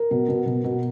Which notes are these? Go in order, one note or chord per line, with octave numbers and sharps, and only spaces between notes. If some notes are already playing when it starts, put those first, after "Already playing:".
Already playing: A#4
B2
B2
B2
B2